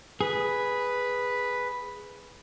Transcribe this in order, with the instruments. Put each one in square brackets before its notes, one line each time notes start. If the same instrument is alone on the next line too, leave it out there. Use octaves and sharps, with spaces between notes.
[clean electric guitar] G#4 [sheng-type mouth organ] B4